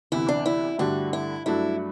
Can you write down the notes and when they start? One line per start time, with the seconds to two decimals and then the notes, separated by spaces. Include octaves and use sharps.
0.12 D2 C3 E3 B3 E4
0.29 D4
0.46 E4
0.79 G2 D3 A3 D4 F#4 G4
1.13 E4
1.46 G2 F#3 A3 D4 E4 F#4